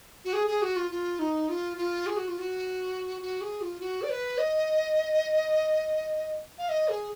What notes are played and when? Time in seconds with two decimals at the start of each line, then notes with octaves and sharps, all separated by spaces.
0.25 F#4
0.33 G#4
0.47 G#4
0.62 F#4
0.76 F4
0.91 F4
1.19 D#4
1.49 F4
1.77 F4
2.06 G#4
2.17 F#4
2.28 F4
2.39 F#4
3.22 F#4
3.41 G#4
3.61 F4
3.80 F#4
4.02 D5
4.10 B4
4.38 D#5
6.58 F5
6.69 D#5
6.88 G#4